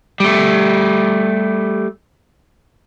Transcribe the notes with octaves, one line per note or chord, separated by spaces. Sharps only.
G3 A3